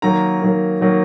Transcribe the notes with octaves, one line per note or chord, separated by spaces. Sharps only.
D#3 F#3 A#3 A#5
D#3 F#3 A#3
D#3 F#3 A#3